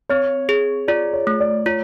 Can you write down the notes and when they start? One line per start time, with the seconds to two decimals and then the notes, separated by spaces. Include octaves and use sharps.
0.09 C4 C#5
0.49 G#4
0.88 F4 D5
1.13 C#5
1.27 A3
1.40 D5
1.66 F4 C#5